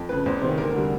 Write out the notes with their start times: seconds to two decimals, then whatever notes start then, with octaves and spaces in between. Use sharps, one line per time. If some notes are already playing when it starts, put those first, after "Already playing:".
Already playing: F2
0.09 C#3 F3 B4
0.26 E2 C5
0.42 C3 D#3 C5
0.58 D2 A#4
0.74 D3 G3